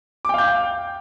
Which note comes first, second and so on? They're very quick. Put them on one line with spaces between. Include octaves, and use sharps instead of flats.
D6 G5 F5 G6